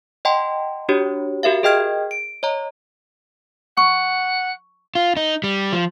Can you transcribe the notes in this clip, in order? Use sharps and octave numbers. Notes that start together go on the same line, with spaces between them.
D#5 F#5 G5 A5 C6
D4 F#4 G4 C#5
F#4 G4 A#4 E5 F5
G#4 A#4 D#5 G5 F6 G#6
D7
C#5 D#5 A#5
F#5 C#6
F4
D#4
G3
F3